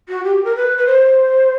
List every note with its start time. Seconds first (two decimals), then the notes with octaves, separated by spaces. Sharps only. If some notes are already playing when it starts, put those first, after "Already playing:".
0.09 F#4
0.24 G4
0.45 A#4
0.56 B4
0.78 B4
0.86 C5